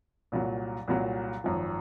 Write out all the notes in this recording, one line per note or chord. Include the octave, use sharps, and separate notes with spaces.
C2 A#2 F#3
C2 A#2 F#3
G#1 F#2 F3